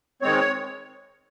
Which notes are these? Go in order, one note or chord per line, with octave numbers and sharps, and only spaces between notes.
D#3 G#3 C4 C#5